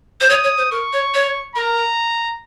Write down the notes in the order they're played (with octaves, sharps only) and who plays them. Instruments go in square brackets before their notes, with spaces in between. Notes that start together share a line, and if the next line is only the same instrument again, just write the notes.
[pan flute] C5
[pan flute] C#5 [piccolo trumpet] D#6
[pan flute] C#5
C5
[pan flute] A#4 [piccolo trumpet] C#6
[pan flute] C#5
C#5
[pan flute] A#4 [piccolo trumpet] A#5